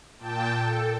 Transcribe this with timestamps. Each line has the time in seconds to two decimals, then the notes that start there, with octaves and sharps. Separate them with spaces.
0.18 A#2 G5 A5
0.60 A4